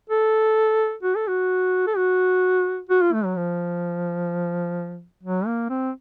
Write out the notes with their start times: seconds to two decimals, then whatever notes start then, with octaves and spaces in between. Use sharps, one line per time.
0.10 A4
1.03 F#4
1.16 A4
1.28 F#4
1.87 A4
1.97 F#4
2.89 F#4
3.02 F4
3.13 A3
3.25 F#3
3.36 F3
5.23 F#3
5.46 A#3
5.70 C4